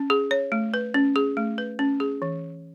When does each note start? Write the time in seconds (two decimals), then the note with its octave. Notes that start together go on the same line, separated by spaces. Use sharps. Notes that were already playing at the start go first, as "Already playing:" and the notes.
Already playing: C#4
0.10 G#4
0.31 C#5
0.52 A3
0.74 B4
0.94 C#4
1.16 G#4
1.37 A3
1.58 B4
1.79 C#4
2.00 G#4
2.22 E3